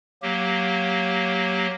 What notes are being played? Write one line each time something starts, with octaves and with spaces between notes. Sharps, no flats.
F#3 A#3 G4